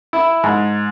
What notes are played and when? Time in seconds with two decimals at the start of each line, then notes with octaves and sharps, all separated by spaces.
0.13 E4
0.44 G#2